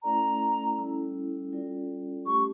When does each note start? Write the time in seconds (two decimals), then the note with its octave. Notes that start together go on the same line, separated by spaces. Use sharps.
0.03 A3 C#4 E4 A4 D5 A#5
0.78 G3 C#4 E4 A4
1.52 G3 C#4 F4 A4 D5
2.26 A3 C#4 G4 C#6